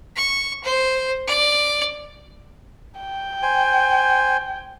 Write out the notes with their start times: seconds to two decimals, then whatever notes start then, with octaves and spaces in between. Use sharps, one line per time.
0.16 C#6
0.64 C5
1.27 D5
3.01 G5
3.42 C5 G#5